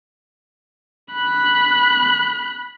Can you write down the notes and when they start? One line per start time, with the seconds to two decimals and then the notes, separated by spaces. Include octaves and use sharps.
1.14 B5 F#6